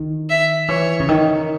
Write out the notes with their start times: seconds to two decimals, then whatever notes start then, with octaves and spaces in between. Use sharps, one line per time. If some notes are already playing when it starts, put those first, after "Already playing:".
Already playing: D#3
0.30 E5
0.69 E3 C#5
1.00 C#3
1.09 D#3